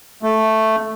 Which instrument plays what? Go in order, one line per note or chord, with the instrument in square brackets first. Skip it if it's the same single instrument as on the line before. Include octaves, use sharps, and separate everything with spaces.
[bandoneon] A3